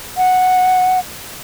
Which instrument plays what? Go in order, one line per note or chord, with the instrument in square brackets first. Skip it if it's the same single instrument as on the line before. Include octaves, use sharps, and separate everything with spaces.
[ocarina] F#5